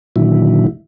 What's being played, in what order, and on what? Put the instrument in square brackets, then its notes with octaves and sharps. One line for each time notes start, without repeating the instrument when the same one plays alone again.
[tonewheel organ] A#2 D3 D#3 F#3 E4